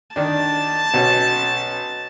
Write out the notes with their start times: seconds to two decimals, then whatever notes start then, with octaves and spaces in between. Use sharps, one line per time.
0.16 D#3 D4 A5
0.94 B1 C#4